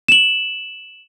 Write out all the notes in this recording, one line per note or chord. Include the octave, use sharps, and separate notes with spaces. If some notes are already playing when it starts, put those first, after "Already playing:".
E7 F#7